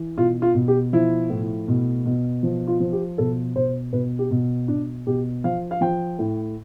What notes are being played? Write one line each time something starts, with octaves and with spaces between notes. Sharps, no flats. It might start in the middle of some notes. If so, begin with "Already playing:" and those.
Already playing: E3
B2 F4
F4
B2
G4
F3 E4
A2
B2
B2
F3
F4
F3
G4
B2 A4
B2 C5
B2 B4
G4
B2
B2 D4
B2 G4
F3 F5
F5
F3 G5
A2